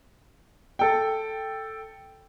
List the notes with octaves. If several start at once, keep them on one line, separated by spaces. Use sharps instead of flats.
A4 G5